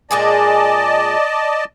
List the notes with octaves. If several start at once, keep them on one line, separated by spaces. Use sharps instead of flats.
A#2 G#3 G#4 D5 D#5 A5